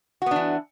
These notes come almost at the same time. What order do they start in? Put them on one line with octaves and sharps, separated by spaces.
F#4 B3 D4 E3